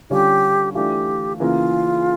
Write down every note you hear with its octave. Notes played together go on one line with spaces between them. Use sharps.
D3 G3 C#4 F4 G4
E3 A3 D4 F4 G4
C#3 E3 A#3 E4 F4